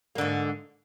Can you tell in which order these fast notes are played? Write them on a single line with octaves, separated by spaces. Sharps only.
A#3 D3 G#2